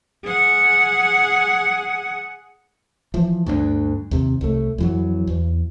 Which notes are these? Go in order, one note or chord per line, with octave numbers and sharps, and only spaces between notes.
G#4 F#5
E3 F3
D2 G2 B3 D4
D#2 C3
C2 A3
F2 E3 F#3
E2